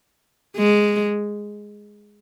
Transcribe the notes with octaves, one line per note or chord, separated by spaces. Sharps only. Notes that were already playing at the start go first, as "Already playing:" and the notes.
G#3